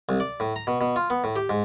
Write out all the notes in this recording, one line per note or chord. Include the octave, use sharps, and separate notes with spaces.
C2
D5
A2
A#5
B2
B2
F4
B3
A2
G4
G#2